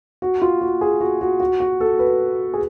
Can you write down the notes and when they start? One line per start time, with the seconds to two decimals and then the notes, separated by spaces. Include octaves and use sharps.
0.22 F#4
0.42 F4
0.61 F#4
0.81 G#4
1.01 F#4
1.21 F#4
1.40 F#4
1.60 F#4
1.80 A4
1.99 B4
2.54 G#4